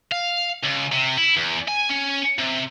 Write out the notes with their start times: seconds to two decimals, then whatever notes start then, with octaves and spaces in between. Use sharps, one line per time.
0.12 F5
0.64 C#2
0.92 C3
1.18 E4
1.37 E2
1.68 G#5
1.90 C#4
2.39 C3